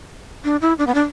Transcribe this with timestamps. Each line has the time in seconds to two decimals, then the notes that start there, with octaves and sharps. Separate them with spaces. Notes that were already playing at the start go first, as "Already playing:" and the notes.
0.44 D4
0.61 E4
0.78 D4
0.87 B3
0.95 D4